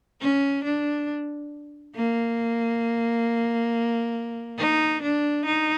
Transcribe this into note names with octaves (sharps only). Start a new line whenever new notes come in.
C#4
D4
A#3
D#4
D4
D#4